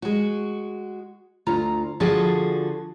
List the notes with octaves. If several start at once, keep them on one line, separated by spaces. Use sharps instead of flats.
G#3 F#4
D2 F4 A#5
D3 F3 F4 F#4 G#4 A4